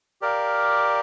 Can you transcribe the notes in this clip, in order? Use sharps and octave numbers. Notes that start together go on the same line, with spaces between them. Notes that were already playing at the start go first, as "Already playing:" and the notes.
G4 A#4 D5 F5